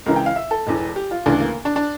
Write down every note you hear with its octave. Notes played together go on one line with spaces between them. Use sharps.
C#2 C#3 E3 A#4
G5
F5
E5
A4
E1 E2 E3
G4
F4
D2 C#3 E3 D4
A#3
D4
D4